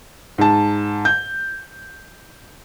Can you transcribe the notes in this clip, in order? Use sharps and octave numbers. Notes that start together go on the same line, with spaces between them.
G#2 A5
G6